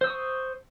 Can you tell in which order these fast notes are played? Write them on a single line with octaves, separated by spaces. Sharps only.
C5 E6 D#6 C#6